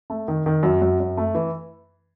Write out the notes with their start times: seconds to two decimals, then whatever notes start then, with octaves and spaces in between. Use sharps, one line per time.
0.10 A3
0.28 D#3
0.46 D#3
0.63 F#2
0.82 F#2
1.00 F#2
1.17 A3
1.35 E3